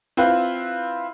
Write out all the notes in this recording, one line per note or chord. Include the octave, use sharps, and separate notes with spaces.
C4 E4 F4 B4